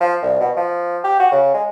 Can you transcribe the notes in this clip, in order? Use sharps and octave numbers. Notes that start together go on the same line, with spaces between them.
F3
C2
B2
F3
G4
F#4
C#3
G#3